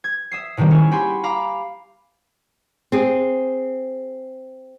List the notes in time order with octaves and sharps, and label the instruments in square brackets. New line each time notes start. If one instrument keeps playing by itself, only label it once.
[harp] G#6
E5 D#6 C7
A2 C3 D#3 G3 A#3
C#4 E4 G#4
F#4 G4 G#5 B5 C6
F5 A#5 B5 D6
[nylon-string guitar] C4 G#4